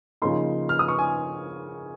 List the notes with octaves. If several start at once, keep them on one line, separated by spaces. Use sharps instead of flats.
C#3 F3 A#3 D#4 C6
F6
D#6
C#6
G#5